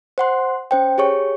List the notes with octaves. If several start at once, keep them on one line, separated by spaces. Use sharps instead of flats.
C5 F#5 C6
C#4 C5 G5
G4 G#4 C#5 C#6